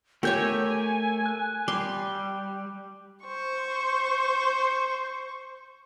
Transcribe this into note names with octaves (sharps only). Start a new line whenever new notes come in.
A3 G4 A#4 C#5 E5 G#5 G6
F#6
G3 C6 D6
C5 C#6